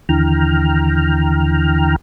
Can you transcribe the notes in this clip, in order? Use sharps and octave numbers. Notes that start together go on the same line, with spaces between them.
D#2 D3 E3 G5 A#5 F6